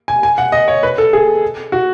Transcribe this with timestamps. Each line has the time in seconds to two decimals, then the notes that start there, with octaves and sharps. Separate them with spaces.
0.08 G#5
0.23 G#5
0.38 F#5
0.52 D#5
0.68 C#5
0.83 B4
0.98 A4
1.13 G#4
1.72 F#4